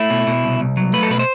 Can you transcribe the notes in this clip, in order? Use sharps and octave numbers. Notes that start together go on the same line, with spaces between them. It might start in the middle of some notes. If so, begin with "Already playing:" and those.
Already playing: A3 E4
B2
B2
C2
C2
F#3
A3 B4
A4
B2 B4
C5